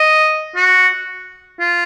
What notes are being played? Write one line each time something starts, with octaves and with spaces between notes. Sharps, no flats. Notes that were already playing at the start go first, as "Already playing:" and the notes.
Already playing: D#5
F#4
F4